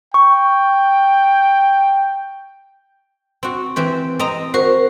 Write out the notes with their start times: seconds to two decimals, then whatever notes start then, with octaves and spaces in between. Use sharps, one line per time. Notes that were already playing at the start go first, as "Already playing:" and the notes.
0.14 G5 C#6
3.43 C4 F#4
3.76 E3 C4 G4
4.19 C4 D#5 A#5
4.54 F#4 A#4 C5